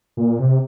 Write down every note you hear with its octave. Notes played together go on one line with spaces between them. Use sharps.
A#2
C3